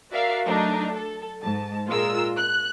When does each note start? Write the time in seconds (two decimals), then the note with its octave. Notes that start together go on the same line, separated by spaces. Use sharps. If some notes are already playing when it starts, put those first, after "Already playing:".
0.11 F#4 A#4 D5 E5 F5
0.46 F#3 A3 D4 D#4
0.93 A4
1.42 G#2 A5
1.87 A#2 G#3 F4 A#4 E6
2.37 F#6